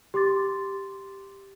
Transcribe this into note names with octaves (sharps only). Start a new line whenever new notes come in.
G4 C6 D6 A6